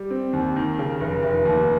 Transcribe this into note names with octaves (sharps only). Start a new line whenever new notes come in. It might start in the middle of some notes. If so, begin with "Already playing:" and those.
Already playing: G3
C4
D#2
D#3
C#3
F1
F1
D#2